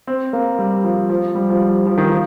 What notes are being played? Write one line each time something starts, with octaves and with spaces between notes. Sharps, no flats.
C4
A#3
G3
F3
F3
G3
F3
G3
F3
D#3
F3